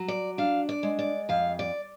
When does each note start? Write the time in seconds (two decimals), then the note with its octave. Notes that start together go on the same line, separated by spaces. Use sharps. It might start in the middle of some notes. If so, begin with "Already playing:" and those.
Already playing: F#3
0.08 D5
0.38 D4 F5
0.69 D5
0.83 G#3
0.99 D5
1.29 F2 F5
1.59 D5